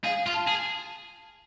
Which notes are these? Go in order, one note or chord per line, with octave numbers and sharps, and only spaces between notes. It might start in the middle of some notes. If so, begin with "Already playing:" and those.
G#4 F5
F4
A5
G#4